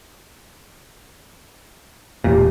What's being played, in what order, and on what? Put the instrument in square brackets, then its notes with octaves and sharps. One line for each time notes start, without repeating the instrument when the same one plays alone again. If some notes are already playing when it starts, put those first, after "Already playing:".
[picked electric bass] E1 A#2 [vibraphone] G4